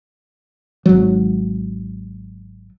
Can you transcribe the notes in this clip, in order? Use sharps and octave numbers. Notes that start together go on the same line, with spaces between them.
G#1 F#3